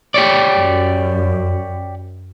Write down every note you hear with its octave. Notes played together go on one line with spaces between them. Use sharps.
G4 C#5 D5
F#2